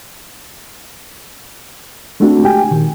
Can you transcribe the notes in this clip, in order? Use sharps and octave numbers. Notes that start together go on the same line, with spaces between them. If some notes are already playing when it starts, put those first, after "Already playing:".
G#3 A3 C4 D4 F#4
G4 G5 G#5
A#2 D#3